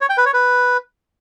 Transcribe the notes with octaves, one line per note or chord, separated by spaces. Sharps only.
C#5
G5
B4
C#5
B4